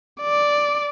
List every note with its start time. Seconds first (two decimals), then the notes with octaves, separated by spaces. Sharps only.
0.22 D5